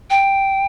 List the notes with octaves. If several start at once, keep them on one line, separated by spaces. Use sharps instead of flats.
G5